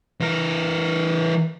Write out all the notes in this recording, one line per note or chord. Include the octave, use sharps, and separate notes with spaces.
E3 A#4